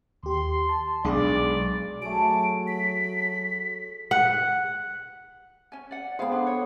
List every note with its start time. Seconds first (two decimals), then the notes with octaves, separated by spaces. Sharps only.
0.23 D#2 G4 C6
0.69 A5
1.04 B1 G#3 D4 G#4 D5
2.02 F#3 A3 G#4 D7
2.67 B6
4.11 F#5
5.72 C#4 G#5
5.91 D5 F#5
6.19 B3 G#4 C5 F5 G5
6.32 D4
6.47 C#5